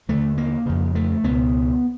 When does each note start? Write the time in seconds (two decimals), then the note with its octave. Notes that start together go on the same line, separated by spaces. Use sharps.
0.09 D#2 D3 A3
0.38 A#3
0.66 F2 C#3
0.95 A3
1.24 C#2 B2 B3